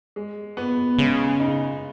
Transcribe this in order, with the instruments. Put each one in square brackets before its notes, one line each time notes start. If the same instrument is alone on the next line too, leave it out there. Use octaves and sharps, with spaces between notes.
[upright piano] G#3
B3
[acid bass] C#3 [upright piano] G#3
[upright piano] D#4